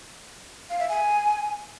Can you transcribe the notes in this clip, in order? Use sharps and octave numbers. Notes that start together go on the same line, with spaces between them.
F5
E5
G#5